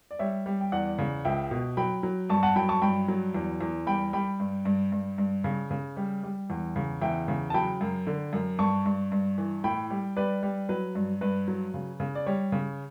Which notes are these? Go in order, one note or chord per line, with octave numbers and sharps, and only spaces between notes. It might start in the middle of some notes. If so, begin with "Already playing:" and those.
D5
G3 C#5 E5
G3
G5
E2 D5 F#5
C#3
C#2 E5 G5
B2
F#3 G5 B5
F#3
G2 A5 C#6
F#5 A5
F#3 G5 B5
A5 C#6
G2 G5 B5
F#3
E2
E2
G3 G5 B5
G3 G5 B5
G2
G2
G2
G2
C#3
C#3
G3
G3
E2
C#3
E2 E5 G5
C#3
A5
F#3 G5 B5
F#2
D3
F#2
G2 A5 C#6
G2
G2
E3
A2 G5 B5
G3
G3 B4 D5
G3
F#3 B4
G2
G2 B4
F#3
C#3
C#3
D5
G3 C#5
C#3